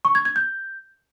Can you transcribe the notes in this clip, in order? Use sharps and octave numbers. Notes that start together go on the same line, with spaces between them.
C#6
G#6
G#6
G6